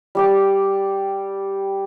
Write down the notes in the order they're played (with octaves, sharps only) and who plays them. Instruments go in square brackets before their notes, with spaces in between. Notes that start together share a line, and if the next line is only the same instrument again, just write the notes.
[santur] G3 G4 D5